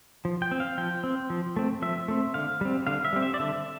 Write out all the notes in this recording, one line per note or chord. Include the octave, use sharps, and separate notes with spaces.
F3
G5
C4
F5
F3 G5
C4
F3
A3 C4
F3 E5
A3 C4
D3 F5
G3 C4
D3 F5
E5
G3 C4
E5
D5
D3 E5